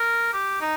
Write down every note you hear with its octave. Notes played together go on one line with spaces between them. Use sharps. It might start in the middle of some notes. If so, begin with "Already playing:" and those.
Already playing: A#4
G4
D#4